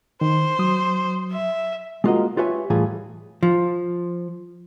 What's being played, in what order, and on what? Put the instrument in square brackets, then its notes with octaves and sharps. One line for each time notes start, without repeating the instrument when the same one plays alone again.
[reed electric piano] D#3 [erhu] C5
[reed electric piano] F#3 D#6
[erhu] E5
[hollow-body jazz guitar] G#3 A#3 F4 F#4 A#4 D#5
F4 G4 B4 C#5 E5 G#5
A2 E3 G3 F4 G#4
F3